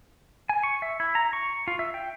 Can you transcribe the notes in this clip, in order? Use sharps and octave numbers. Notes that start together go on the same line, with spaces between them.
G#5
C#6
E5
E4
A#5
C#6
F4
E5
G5